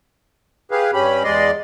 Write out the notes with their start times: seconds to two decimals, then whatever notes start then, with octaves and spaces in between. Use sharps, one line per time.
0.71 G4 G#4 B4 F5
0.93 G2 C#4 G4 B5
1.24 E2 G#3 D5 D#5 C6